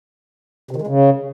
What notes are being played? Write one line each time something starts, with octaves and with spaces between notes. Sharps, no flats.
C3
D#3
G#3
C#3